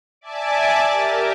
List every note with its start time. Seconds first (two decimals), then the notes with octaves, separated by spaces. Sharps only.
0.21 D5 E5 G#5 A5 D6
0.91 G4 A#4